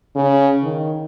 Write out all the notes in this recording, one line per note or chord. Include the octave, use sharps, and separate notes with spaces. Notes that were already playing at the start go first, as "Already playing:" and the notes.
C#3
D#3